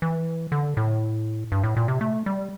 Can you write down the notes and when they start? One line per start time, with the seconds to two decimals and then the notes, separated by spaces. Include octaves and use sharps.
0.02 E3
0.52 D3
0.77 A2
1.52 G2
1.64 A2
1.77 A#2
1.88 C3
2.01 A3
2.26 G3